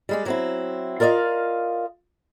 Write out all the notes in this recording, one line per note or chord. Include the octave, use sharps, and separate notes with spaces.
G3 G#3 G4
F#3 C4 E4
F4 A#4 D5 D#5 F5